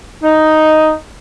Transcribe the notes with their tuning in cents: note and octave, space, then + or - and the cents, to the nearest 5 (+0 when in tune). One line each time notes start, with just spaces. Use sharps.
D#4 +0